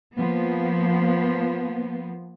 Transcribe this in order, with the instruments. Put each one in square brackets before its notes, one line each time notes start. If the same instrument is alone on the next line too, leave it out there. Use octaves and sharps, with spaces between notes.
[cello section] F3 A#3 B3